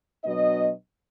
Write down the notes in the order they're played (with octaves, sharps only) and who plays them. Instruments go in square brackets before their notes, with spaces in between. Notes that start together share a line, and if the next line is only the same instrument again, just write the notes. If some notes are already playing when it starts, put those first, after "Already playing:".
[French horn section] B2 F#3 B3 D4 D#5